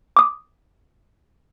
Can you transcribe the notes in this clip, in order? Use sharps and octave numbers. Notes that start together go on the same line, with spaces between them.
D6 D#6